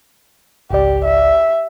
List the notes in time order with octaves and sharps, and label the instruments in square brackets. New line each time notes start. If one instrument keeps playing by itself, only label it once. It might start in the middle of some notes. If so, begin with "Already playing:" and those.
[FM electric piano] G#1 C#2 D5 [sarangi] G4
[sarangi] E5